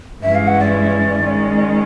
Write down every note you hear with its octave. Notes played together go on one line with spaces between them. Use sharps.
G2 E3 G#3 C#4 E4 E5
F5
F#5
D5
D#3 G#3 C#4